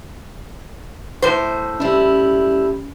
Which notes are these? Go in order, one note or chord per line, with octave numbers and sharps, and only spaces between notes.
A2 C5
G3 C#4 E4